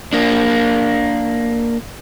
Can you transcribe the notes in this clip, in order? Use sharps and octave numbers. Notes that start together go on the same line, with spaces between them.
A#3 D4